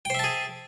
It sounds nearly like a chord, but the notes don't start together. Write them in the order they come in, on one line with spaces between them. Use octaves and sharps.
G5 C5 E5 A5 G#4